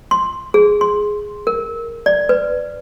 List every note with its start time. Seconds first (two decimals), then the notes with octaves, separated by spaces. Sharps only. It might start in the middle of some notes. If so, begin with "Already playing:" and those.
0.11 C6
0.54 G#4
0.81 C6
1.47 A#4
2.06 D5
2.29 B4